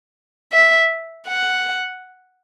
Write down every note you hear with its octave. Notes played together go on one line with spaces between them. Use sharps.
E5
F#5